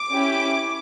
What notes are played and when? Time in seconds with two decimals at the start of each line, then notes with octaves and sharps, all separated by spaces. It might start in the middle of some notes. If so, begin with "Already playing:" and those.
Already playing: D6
0.10 C#4 E4 G4